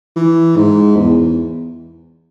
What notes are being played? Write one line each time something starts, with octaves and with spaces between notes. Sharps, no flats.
E3
G#2
E2